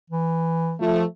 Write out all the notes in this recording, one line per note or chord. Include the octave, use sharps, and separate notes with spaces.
E3
F3 A3